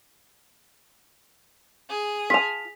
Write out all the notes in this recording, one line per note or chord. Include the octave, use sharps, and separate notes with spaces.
G#4
F4 A5 B6 F7